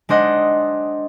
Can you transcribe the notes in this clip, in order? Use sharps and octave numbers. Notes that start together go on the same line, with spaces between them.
G#3 D4 C5 D#5 F#5